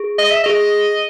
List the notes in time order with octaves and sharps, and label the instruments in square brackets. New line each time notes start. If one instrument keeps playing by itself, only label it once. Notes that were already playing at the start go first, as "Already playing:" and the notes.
Already playing: [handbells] G#4
[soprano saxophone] D#5
E5
[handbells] G#4 [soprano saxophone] D#5